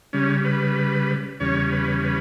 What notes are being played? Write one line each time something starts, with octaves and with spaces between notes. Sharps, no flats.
C#3 G3 C#4
B4
E2 C#3 G3 C#4 C#5
B4
B4